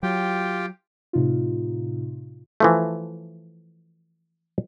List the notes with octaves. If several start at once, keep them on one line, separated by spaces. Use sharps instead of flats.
F#3 F4 G4 G5
A2 C3 D#4 F4
E3 F3 A3